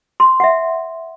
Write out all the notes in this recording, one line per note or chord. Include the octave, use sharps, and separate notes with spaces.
C6
E5 F#5